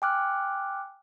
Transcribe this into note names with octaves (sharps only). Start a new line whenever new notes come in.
G5 G#5 D6 F6 F#6